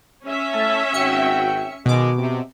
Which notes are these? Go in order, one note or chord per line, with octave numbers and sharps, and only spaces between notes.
C#4 E5
A3 E4 A5
G#1 F#4 G5 C#7
B2 D#3 G#3 D6
C3